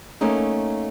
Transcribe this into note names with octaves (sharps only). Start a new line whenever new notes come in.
A3 A#3 C#4 D#4